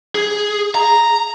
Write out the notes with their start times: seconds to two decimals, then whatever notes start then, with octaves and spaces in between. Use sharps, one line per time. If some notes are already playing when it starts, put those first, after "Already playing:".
0.15 G#4
0.75 A#5